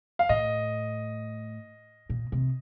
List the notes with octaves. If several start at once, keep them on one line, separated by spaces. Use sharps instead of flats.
F5
A2 D#5
A#2
C3